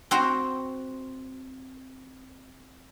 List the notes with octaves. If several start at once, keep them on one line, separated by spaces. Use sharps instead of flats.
C4 F#4 C5 G5 A#5